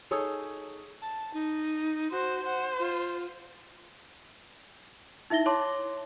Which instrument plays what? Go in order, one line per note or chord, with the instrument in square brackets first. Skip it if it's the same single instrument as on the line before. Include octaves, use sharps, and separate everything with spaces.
[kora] D#4 G#4 A4 C#5
[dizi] A5
D#4
[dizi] F#4 [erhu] C5
[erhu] C5 [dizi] F#5
[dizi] F4
[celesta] D#4 E4 E5 A#6 G7
C#5 A5 C6 D6